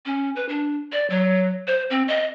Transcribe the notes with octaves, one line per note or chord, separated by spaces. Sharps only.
C#4
B4
D4
D5
F#3
C5
C4
D#5